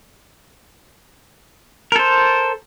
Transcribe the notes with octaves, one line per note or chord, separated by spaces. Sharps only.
A4 A#4 C5